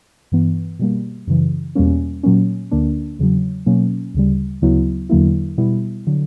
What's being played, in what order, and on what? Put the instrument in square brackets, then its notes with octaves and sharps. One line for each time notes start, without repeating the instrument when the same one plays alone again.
[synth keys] G2 E3 B3
B2 G3 A#3
F#2 C#3 E3
E2 B2 G3 A#3 C#4
A#2 F#3 A#3 C#4
D2 D3 A#3 D4
E2 C#3 F#3
B2 F#3 A#3 C#4
D2 C#3 G3
D2 C#3 F#3 B3 E4
E2 D3 F#3 A#3 E4
B2 G3 B3 E4
D3 F#3